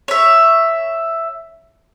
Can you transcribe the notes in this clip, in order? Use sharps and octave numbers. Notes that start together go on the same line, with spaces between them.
C#5 E5